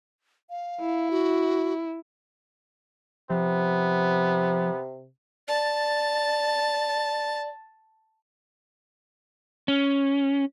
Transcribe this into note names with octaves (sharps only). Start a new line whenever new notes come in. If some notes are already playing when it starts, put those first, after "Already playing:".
F5
E4
F#4
C3 F3 B3
D5 A5
C#4